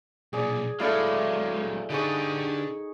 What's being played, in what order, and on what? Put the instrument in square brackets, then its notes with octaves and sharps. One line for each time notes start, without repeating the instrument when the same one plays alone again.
[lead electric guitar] B1 A#2 [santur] G#4 D5
[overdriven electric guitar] F#3 A3 [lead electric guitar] G#3 [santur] E4 [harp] A4 D5 F5
[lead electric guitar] D3 D4 [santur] D#4 G#4 C#6 [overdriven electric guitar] G4 B4